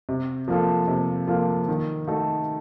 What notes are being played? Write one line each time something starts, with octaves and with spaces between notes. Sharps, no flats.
C3
F3 A#3 F4 A4
C3
F3 A#3 F4 A4
D#3
A3 D#4 F#4 A4